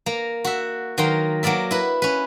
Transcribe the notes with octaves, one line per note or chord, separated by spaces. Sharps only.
A#3 A#5
F#4 E5
D#3 F#3 A#3 A#4 C6
F#3 A#3 A#4 D5 E5
E4 B4
C#4 B4